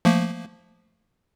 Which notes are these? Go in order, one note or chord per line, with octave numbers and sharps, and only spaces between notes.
F3 A3 A#3